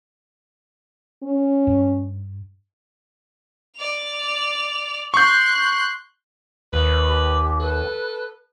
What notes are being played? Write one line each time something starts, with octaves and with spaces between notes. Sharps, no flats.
C#4
G2
D5 F7
C6 C#6 F#6 G6
D#2 B4
G4
A4 B4